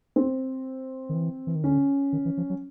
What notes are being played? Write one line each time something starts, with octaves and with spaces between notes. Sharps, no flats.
C4
D#3
E3
E3
D#3
D3 C#4
D#3
E3
F3
F#3